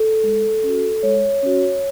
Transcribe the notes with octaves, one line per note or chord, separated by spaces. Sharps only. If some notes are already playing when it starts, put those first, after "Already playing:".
Already playing: A4
G#3
C#4 F#4
G#3 C#5
C#4 F#4